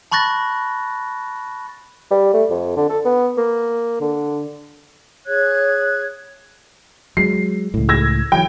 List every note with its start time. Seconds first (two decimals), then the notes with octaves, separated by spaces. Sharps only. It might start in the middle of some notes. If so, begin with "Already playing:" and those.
0.12 A5 B5 C#6 F#6 A6 A#6
2.11 G3
2.34 A3
2.50 F2
2.77 D3
2.90 A4
3.05 B3
3.38 A#3
4.01 D3
5.28 G#4 C#5 F#6 G#6
7.17 F#3 G#3 C7
7.74 C#2 A2
7.89 E6 G#6 A#6
8.32 E3 F#3 G5